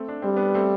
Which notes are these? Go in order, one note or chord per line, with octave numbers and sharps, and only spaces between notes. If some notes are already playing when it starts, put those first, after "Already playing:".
Already playing: A3 C4
D4
G3 C4
B3 D4
A3 C4